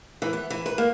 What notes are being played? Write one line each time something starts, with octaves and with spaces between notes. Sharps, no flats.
E3
B3
E3
B4
A#3